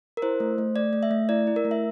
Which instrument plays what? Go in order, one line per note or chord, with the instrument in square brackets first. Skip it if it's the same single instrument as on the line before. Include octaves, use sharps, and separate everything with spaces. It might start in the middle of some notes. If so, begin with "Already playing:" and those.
[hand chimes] A#4
E4 C5
A3
A3
A3 D5
A3
E5
A3
E4 D5
E4
A#4
A3
E5